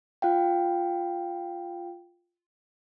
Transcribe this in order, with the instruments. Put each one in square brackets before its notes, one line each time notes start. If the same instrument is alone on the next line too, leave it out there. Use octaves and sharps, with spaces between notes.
[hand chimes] F4 F5 G5